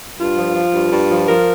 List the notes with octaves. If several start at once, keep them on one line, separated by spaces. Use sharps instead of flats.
G2 F4
F3
F3
G2
G2
F3
F3 A#4